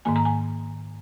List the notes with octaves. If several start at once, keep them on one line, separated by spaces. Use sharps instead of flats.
G#2 D#3 A#3 G#5
A#5
G#5